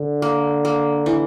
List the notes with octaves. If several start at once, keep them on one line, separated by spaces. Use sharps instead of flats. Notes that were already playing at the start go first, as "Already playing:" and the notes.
Already playing: D3
A#3
A#3
E3